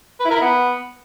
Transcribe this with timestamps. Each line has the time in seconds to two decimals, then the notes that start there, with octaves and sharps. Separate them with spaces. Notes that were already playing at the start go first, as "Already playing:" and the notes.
0.20 B4
0.25 E4
0.30 A#4
0.36 E4
0.41 B3